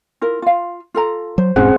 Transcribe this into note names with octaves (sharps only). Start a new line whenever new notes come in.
E4 F4 A#4
F4 F5
F4 A4 A#5
F#3 C5
E1 G#2 C4 C#4 F4 G#4 F#5